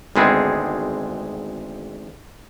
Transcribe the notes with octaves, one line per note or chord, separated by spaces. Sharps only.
G#1 D2 G#3 B3 C4 G#4